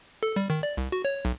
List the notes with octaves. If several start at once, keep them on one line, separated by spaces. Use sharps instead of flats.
A4
G3
D#3
D5
C2
F#4
C#5
B1